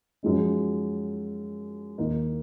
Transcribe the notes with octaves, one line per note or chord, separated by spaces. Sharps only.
F#2 F3 G#3 D#4
D#2 D#3 A#3 D#4